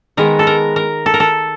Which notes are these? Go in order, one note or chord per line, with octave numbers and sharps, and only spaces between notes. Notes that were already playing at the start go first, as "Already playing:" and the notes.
D#3 G#3 B3 A#4
A4
A#4
A#4
A4
A#4
A4